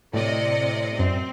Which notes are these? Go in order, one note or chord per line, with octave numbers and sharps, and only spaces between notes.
A2 C3 D5 D#5
F#2 C4